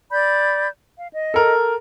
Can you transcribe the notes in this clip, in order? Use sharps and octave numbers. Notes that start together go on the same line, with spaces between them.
D5 B5 G6
F5
D#5
A4 A#4